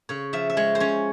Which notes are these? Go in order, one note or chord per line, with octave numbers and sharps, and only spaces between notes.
C#3 C#5
F3 E5
E5
G#3 C#5
C5
C#4 C#5